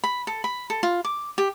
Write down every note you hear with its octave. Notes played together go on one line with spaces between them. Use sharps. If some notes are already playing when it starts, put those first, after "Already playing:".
B5
A4
B5
A4
F4
D6
G4